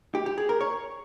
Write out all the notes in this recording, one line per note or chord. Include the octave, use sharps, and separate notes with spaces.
G4
G4
G#4
A#4
C#5